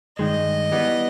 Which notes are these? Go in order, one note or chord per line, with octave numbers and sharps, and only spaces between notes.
G2 D#3 G#3 D#5
E3 G3 B3